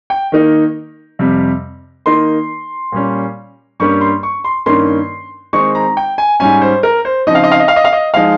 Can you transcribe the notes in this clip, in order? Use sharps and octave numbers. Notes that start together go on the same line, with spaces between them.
G5
D#3 A#3 D#4
F2 C3 G3
D#3 A#3 D#4 C6
A#2 G3 C#4
G2 G3 A#3 C#4 C#6
C6
C#6
C6
G2 D#3 A#3 C#4 C6
D#3 G#3 C4 D#4 C#6
A#5
G5
G#5
G#2 G3 C#4 G#5
C5
A#4
C5
C#3 F3 C4 D#4 D#5
F5
D#5
F5
D#5
F5
D#5
F5
D#5
F3 G#3 D#4 F5